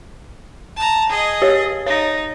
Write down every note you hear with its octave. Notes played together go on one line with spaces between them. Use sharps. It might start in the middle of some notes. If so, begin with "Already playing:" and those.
A5 A#5
G#4 D#5
G4 C#5
D#4 C#5 A#6